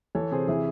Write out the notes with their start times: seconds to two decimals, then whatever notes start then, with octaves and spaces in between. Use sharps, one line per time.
0.15 E3 A4 C#5
0.32 C3 G#4 C5
0.48 E3 E4 G#4